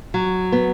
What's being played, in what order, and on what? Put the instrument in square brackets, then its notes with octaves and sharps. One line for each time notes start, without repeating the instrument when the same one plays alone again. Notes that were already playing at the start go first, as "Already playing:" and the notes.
[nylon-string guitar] F#3
B3